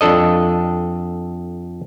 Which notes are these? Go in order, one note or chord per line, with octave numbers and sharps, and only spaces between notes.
F2 D4 A4 D#5